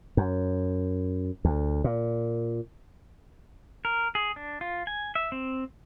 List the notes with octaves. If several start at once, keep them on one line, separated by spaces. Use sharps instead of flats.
F#2
D2
A#2
A#4
G#4
D4
F4
G#5
E5
C4